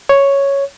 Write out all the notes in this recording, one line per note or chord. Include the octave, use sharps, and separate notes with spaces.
C#5